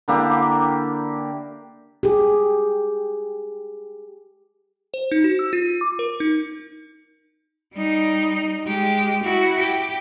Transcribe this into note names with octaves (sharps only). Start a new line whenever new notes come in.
D3 A#3 E4 G4
G4 G#4
C5
D#4
F#4
E6
F4
D6
A#4
D#4
G3 D#4
G#3 G4
E4 F#4
G4